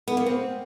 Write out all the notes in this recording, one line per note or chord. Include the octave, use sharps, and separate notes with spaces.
B3
A#3
C4